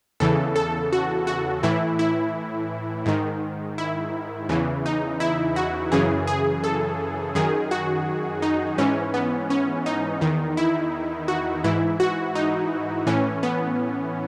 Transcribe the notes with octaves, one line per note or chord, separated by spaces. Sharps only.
E2 C#3 E3 A4
A4
F#4
F#4
A2 E3 E4
E4
G#2 D#3
E4
E2 C#3 E3
D#4
E4
F#4
F#2 C#3 E3 G#4
G#4
A4
F#2 D#3 G#4
F#4
D#4
G#2 E3 C#4
B3
C#4
D#4
E2 D#3
E4
F#4
G#2 E3 E4
F#4
D#4
A2 E3 C#4
B3